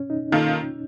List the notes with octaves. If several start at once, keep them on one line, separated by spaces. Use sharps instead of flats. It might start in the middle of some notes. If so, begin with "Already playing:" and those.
Already playing: C#4
D#4
D#3 A#3 F4 A4